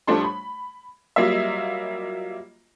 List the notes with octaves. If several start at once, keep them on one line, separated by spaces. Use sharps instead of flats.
A2 F3 G3 A3 D4 C6
B5
F#3 G3 A#3 F4 D#5 E5